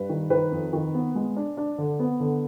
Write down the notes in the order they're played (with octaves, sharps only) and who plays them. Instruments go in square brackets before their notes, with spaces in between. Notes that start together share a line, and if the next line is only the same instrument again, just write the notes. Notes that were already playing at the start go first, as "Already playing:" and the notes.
Already playing: [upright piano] G2 B4
D#3
D#3 B4
F2
D#3
B3
G#3
D4
D4
D3
B3
D3